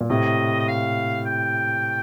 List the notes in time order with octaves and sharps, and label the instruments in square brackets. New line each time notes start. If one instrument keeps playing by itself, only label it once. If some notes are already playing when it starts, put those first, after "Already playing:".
[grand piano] A#2
[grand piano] A2 C3 [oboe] D#5
[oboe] D#5
F5
G5